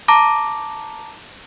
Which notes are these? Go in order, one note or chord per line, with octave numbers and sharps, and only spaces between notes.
A5 A#5 D6 A#6